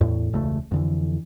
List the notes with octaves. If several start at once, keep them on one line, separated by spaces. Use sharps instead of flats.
E2 A2
E1 C#2 C#3 A3
F2 D3 E3